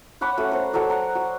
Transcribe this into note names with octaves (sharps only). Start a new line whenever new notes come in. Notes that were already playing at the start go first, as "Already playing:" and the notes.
C#5 F#5 B5 D6
A3 C#4 F#4 F#5
A#4 C5 F#5
F#3 A4 A#4 D5
F#5 A#5
F#4